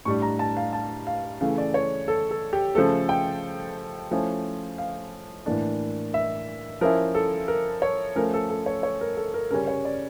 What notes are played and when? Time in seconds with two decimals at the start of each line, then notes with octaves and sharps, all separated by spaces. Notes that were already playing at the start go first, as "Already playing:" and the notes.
0.05 A2 G3 D4 C#6
0.22 A#5
0.39 A5
0.57 F5
0.73 A5
1.07 F5
1.41 C#3 E3 A3 F5
1.58 D5
1.74 C#5
2.08 A4
2.31 A4
2.53 G4
2.75 C#3 F3 A3 A4
3.09 G5
4.11 F3 A3 C#4 E4
4.78 F5
5.46 A2 E3 A#3 D4
6.14 E5
6.81 F3 C#4 E4 A#4
7.15 A4
7.48 A#4
7.82 C#5
8.16 F3 A3 C#4 A#4
8.34 A4
8.50 A4
8.66 C#5
8.83 C#5
9.01 A#4
9.17 A4
9.34 A#4
9.51 C#3 G3 C#4 A#4
9.68 C#5
9.85 D5